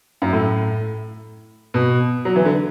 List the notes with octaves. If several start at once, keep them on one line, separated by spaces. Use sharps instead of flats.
F#2
A2
B2
F#3
E3
D3